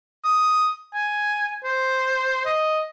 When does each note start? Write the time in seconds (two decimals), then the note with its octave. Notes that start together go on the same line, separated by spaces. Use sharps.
0.25 D#6
0.94 G#5
1.65 C5
2.46 D#5